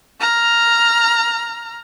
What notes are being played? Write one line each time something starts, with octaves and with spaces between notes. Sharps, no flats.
A#5 F6